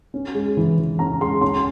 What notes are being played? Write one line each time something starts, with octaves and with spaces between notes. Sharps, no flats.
C#4
G#3
E3
E3
C#4 A#5
G#3 C6
C#4 C6